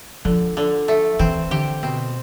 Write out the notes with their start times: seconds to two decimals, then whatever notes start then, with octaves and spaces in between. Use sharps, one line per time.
0.25 D3 F3
0.57 D3
0.88 A3
1.19 E3 C4
1.51 D3 G4
1.82 B2 C4